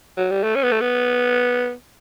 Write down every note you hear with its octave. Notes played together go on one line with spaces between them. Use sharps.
F#3
G3
A3
C#4
B3
A3
B3